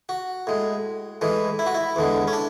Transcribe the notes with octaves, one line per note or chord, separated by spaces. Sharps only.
F#4
A2 G#3
A2 E3 G#3
E4
F#4
E4
E2 D3 G#3
C#4
D4